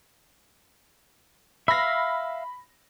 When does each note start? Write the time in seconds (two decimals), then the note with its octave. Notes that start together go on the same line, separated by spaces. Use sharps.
1.68 E5 F5 B5 A#6